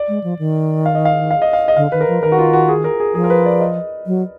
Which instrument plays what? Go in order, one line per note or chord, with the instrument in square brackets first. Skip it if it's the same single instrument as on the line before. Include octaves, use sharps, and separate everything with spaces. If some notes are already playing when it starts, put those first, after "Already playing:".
Already playing: [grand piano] D5
[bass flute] G#3
F3
D#3
[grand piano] F5
D#5
F5
F5
D#5
F5
D#5
[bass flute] D3 [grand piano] F5
[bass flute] D#3 [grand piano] B4
[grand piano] A#4
[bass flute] F3
[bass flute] D#3 [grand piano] A#4
[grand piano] F#4
F4
F#4
G#4
A#4
G#4
[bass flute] F3 [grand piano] G#4
[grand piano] A#4
B4
D5
D#5
[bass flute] F#3